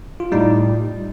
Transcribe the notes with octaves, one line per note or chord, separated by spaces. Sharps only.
F4
A2 G3 D#4